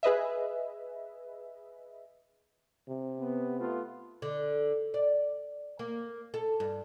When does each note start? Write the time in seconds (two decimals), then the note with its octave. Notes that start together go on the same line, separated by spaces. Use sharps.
0.03 G#4 B4 D#5 E5
2.89 C3
3.20 B3
3.59 A3 B3 F4
4.22 D3
4.94 D5
5.79 A#3
6.34 A4
6.60 G2